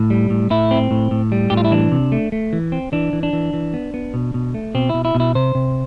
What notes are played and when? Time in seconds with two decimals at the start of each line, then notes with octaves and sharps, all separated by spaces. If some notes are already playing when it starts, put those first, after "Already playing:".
Already playing: A2
0.10 G3
0.30 A2
0.51 A2 E4
0.71 C4
0.91 A2
1.11 A2
1.32 G3
1.50 A2 G4
1.57 F4
1.65 E4
1.71 E3 D4
1.92 C3
2.12 A3
2.32 A3
2.53 E3
2.72 C4
2.93 E3 D4
3.13 E3
3.23 D4
3.33 E3
3.53 E3
3.74 B3
3.94 B3
4.14 B2
4.34 B2
4.54 A3
4.74 B2 C4
4.89 B2 E4
5.05 E4
5.15 B2
5.20 E4
5.35 C3 C5
5.55 C3